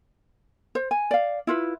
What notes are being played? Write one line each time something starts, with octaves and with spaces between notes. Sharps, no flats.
C5
G#5
D5 F5
E4 F4 B4